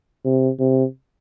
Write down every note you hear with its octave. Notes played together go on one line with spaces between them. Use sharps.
C3
C3